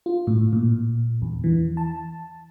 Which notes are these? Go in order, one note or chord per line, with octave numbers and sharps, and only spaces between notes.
F4
A2
A#2
E2
E3
A5